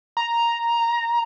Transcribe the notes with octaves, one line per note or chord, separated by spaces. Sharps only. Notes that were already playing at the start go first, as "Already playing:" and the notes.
A#5